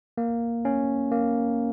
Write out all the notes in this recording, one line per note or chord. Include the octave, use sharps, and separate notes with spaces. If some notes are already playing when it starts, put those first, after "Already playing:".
A#3
C#4
A#3